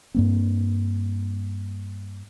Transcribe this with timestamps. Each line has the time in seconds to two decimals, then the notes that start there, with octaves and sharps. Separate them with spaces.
0.15 G2 A#3 C4